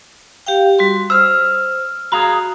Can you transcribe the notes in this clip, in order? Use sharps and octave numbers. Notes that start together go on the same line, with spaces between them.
G4 F5 G5
G3 F#4 C6
C5 E6 F6
F#4 G#4 F5 A#5